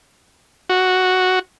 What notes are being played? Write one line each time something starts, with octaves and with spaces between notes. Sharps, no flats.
F#4